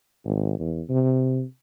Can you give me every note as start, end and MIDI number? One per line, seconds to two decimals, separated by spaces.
0.25 0.57 32
0.59 0.82 40
0.89 1.43 48